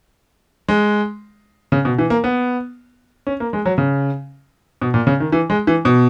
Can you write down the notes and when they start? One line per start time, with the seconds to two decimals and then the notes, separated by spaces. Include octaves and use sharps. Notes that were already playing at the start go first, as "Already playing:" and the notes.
0.69 G#3
1.72 C#3
1.85 B2
1.98 E3
2.10 A#3
2.24 B3
3.27 C#4
3.40 A#3
3.53 G#3
3.65 F#3
3.78 C#3
4.82 B2
4.94 A#2
5.07 C#3
5.20 D#3
5.32 E3
5.50 G#3
5.67 E3
5.85 B2